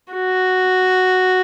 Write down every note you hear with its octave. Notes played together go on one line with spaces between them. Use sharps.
F#4